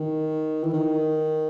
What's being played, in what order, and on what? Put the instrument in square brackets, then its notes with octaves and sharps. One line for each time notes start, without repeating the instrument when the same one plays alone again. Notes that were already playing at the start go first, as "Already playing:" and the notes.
Already playing: [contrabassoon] D#3
E3
D#3